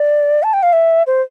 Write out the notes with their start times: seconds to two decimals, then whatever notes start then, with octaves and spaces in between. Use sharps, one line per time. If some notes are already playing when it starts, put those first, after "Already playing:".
Already playing: D5
0.43 A5
0.53 G5
0.63 F5
0.73 E5
1.07 C5